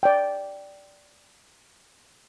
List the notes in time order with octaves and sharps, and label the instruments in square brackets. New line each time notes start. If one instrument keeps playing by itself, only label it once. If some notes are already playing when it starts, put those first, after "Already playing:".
[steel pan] D5 G5